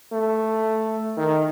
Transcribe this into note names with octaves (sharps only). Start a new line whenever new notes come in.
A3
D#3